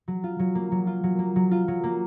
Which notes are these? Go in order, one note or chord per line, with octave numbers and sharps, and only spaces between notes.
F#3
F4
F#3
A#3
F#3
F4
F#3
A#3
F#3
F4
F#3
A#3